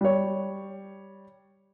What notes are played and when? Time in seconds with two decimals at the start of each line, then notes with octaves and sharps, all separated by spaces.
0.01 G3 C#5